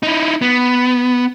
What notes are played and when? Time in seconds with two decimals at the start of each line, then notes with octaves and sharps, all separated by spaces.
0.03 D#4 E4
0.42 B3